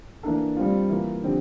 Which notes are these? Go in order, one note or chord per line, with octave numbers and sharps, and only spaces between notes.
E3 A#3 D4 A4
G3 C4 F4
E3 A#3 F4
D3 F3 C4 G4